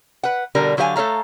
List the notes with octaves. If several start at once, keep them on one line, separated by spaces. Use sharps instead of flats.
B4 F#5
B2 D3 G3 A#4 D5
D3 F#3 G4 B4 F5 G#5
A3 A4 C#5 F5 A#5